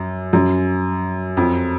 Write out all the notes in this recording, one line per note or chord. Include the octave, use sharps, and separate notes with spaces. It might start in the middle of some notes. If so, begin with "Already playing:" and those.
Already playing: F#2
F#2
F2